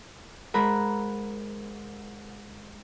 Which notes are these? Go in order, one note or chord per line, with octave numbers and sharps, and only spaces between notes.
G#2 A#4 B5 F#6